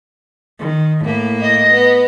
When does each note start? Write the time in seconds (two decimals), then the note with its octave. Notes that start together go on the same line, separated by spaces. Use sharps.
0.59 D#3
1.04 A2 A#3
1.41 D#5
1.73 B3